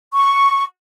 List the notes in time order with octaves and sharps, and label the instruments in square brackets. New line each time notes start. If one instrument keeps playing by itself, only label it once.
[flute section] C#6